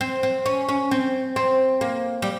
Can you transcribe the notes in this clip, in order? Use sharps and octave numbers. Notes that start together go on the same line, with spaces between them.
C4
C4
C#4
C#4
C4
C4
A#3
G3